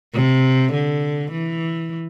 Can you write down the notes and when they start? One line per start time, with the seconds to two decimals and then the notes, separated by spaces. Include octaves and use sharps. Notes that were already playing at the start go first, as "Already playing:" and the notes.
0.14 C3
0.73 D3
1.32 E3